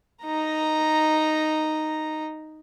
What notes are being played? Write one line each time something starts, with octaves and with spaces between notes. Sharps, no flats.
D#4 A#5